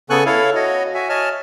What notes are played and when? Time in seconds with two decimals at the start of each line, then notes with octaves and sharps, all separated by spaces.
0.10 C#3 B3 A4 G#5 C#6 F#6
0.26 E4 A4 C#5 F5
0.55 F#4 C#5 D#5
0.94 F#4 E5 G#5
1.09 C#5 D#5 G#5 A5 F6